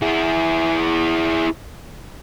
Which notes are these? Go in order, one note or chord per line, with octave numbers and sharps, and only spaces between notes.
E4 G#4